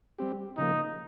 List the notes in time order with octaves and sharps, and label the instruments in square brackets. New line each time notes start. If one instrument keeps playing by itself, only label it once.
[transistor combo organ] G3 C4 G4
[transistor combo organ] C#3 F3 A#3 [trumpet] D#4